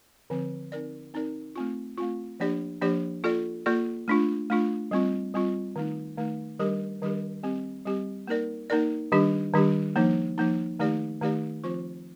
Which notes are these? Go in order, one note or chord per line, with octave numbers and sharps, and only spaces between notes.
D3 F3 C4
C4 D#4 A#4 D5
C4 D#4 A#4 D5
A3 C4 F4
A3 C4 F4
F3 A#3 D4 G4 D5
F3 A#3 D4 G4 D5
A#3 F4 A4 D5
A#3 F4 A4 D5
A3 D4 F4
A3 D4 F4
G3 C4 F4
G3 C4 F4
D#3 A3 D#4
D#3 A3 D#4
D#3 G3 D4 G4 A#4
D#3 G3 D4 G4 A#4
G3 C4 G4
G3 C4 G4
A#3 D#4 A#4 D5
A#3 D#4 A#4 D5
D#3 G3 D4 G4
D#3 G3 D4 G4
F3 A#3 D#4
F3 A#3 D#4
D#3 A3 D#4 G4 D5
D#3 A3 D#4 G4 D5
F3 C4 F4 C5